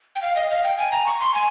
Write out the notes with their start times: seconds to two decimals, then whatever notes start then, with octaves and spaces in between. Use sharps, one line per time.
0.15 G5
0.22 F5
0.36 D#5
0.50 F5
0.64 G5
0.78 G#5
0.92 A#5
1.06 C#6
1.20 C6
1.34 G#5